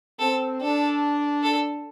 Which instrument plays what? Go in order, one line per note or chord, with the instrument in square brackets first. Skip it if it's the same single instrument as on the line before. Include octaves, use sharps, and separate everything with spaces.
[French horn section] C4 [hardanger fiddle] A4
[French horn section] D4 [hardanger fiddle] A4
[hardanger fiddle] A4